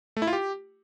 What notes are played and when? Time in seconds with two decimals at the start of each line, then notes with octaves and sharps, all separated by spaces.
0.17 A3
0.22 E4
0.27 F4
0.33 G4